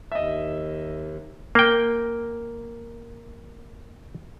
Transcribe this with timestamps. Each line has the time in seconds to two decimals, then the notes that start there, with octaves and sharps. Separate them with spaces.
0.12 D#2 D#5 E5
1.55 A#3 G5